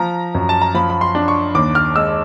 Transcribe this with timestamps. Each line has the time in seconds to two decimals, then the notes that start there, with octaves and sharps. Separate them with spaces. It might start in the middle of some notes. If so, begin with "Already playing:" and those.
Already playing: F3 A#5
0.35 F#2
0.49 A5
0.62 A#5
0.74 F3 B5
0.90 B5
1.01 C6
1.15 D4
1.28 C#6
1.55 D#2 D6
1.75 F6
1.96 G#3 E6